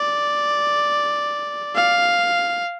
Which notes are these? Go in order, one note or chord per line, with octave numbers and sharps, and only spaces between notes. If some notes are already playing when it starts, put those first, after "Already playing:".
Already playing: D5
F5